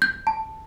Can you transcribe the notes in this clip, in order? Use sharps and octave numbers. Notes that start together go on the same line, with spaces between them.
G6
A5